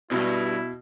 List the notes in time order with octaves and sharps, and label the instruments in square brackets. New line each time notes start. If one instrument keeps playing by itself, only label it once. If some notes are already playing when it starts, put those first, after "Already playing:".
[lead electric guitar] C#2 G2 [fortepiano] B2 [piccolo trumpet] E4